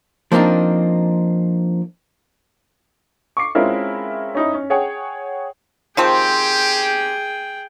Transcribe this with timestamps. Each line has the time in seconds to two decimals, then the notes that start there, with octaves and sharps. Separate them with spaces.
0.32 F3 A#3 C4 D4 D#4
3.37 C#6 D6 C7
3.55 G#3 C4 C#4 E4 F4 A#4
4.35 C#4 D#4 E4
4.54 C#4
4.70 G#4 C#5 F#5 G5
5.97 D#3 F3 C4 G4 G#4 G5